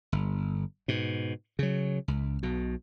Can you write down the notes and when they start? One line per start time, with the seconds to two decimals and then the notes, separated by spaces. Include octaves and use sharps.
0.12 G1
0.88 G#2 B2
1.59 C#3 F#3
2.08 C#2
2.43 B1 B2